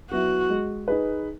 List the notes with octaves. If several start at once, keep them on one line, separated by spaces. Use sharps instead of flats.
F#3 B3 E4 F#4
G#3
D#4 G#4 B4